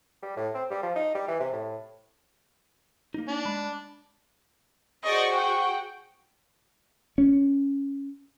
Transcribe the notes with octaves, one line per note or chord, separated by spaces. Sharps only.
G3
A2
C4
G3
F3
D#4
G3
E3
C3
A2
A#3 D#4
D4
G#3 B5
F#4 G#4 C5 D5 D#5 C#6
F#5 G5 C#6
C#4